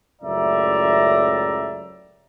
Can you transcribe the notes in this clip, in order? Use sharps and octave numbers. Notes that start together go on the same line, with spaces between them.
C#2 F#2 A2 D5 E5 A#5